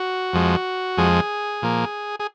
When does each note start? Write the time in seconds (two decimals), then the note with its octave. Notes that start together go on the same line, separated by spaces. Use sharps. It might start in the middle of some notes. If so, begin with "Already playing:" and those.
Already playing: F#4
0.33 F2 F3 G#3
0.98 F2 F3 G#3 G#4
1.62 A#2 F3 A#3
2.20 G#4